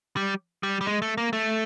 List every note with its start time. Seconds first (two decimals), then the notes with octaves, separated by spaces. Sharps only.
0.17 G3
0.63 G3
0.81 G3
0.87 G#3
1.02 A3
1.18 A#3
1.33 A3